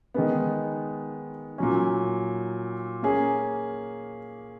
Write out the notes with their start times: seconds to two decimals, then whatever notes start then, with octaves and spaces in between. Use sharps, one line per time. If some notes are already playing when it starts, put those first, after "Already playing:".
0.14 D#3 G#3 B3
1.58 A#2 F#3 C#4
3.03 A#3 C#4 G#4